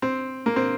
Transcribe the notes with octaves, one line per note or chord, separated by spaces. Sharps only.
C4
A#3
C4